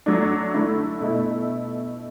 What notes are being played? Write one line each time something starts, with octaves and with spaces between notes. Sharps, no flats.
F#3 A3 D4
D3 A3 E4
B2 A3 E4